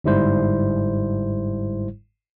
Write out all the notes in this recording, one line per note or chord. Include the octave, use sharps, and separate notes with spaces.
G1 G#2 G3 E4 C5